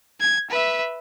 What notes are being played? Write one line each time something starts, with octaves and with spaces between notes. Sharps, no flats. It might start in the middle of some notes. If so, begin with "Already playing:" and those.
G#6
B4 E5